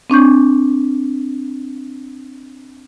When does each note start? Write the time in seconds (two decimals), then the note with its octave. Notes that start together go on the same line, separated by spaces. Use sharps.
0.10 C4 D4 C#6 G6